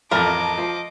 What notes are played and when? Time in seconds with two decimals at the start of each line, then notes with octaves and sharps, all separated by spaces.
0.11 A1 F2 A#4 D#5 A5 D6
0.58 F3